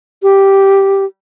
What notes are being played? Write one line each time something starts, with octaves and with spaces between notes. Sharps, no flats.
G4